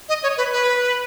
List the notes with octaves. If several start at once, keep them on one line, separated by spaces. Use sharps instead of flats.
D#5
C#5
B4
B4